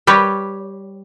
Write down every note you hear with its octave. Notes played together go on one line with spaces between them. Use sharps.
G3 G4 B4 C#5